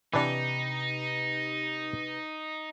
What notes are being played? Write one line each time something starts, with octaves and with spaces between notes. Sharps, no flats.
C3 E3 D4 D#4 G4 B4